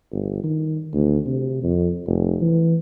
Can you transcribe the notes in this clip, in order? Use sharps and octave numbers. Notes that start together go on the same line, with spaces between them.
G1
D#3
D2
C3
F2
F1
E3